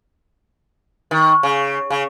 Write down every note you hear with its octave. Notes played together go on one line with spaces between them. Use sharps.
D#3
C#3
C#3